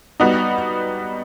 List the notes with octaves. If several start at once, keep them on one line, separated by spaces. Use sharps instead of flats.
G3 B3 D#4 F#4